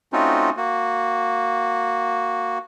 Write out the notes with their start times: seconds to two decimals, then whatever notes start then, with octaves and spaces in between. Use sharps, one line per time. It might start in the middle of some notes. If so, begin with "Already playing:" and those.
0.13 A3 C4 C#4 D#4 F4 F#4
0.57 A#3 F#4